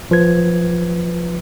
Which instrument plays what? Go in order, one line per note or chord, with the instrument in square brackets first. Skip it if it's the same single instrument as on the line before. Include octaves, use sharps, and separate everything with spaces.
[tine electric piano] A#1 F3 B4 G#6